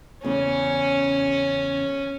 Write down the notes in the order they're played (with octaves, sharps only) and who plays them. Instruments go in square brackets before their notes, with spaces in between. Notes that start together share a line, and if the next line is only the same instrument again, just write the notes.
[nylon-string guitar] E2 C#3 [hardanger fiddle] C#4